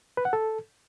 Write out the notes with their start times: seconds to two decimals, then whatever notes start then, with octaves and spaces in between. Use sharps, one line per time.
0.17 B4
0.25 F#5
0.33 A4